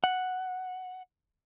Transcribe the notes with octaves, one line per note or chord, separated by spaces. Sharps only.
F#5